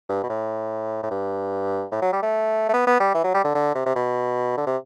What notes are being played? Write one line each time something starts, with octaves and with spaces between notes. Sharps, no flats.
G2
B2
A2
A2
G2
A2
F#3
G3
A3
A3
B3
B3
G3
E3
F#3
G3
D3
D3
C3
C3
B2
D3
C3